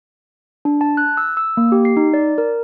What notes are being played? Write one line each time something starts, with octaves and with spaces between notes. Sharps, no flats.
D4
A5
F#6
E6
E6
A#3
G4
C7
D#4
D5
A#4